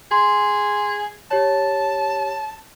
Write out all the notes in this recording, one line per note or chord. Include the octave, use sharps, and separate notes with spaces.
G#4 C6
G4 C#5 A5